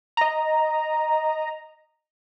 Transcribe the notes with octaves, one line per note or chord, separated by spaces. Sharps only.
D#5 A#5